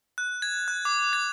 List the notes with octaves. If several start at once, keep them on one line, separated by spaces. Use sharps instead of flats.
F#6
G#6
F#6
D6
G#6